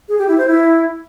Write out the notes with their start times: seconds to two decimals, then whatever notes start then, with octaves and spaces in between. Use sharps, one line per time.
0.09 G#4
0.18 G4
0.28 E4
0.38 C5
0.47 E4